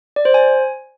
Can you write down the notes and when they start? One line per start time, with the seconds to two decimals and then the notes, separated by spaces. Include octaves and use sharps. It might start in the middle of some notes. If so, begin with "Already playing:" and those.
0.16 D5
0.25 C5
0.34 G#5